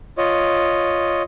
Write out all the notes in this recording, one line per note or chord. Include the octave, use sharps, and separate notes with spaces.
F4 C#5 D#5